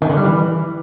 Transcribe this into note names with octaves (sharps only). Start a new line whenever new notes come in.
D#3
D3
G3
E3